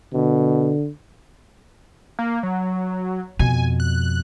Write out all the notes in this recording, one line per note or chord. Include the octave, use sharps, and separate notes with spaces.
B2 D3
A#3
F#3
F2 B2 G#5
F#6